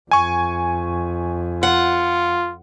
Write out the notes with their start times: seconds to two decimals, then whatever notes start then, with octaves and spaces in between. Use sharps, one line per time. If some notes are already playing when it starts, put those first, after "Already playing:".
0.11 F2 G#5 C#6
1.63 F4 F#5